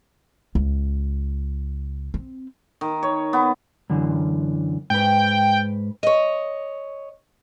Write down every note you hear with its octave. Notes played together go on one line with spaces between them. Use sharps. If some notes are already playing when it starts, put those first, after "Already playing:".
C#2
C4
D#3
C#5
B3
F#2 D3 E3
G#2 B4 G5
C#5 D#5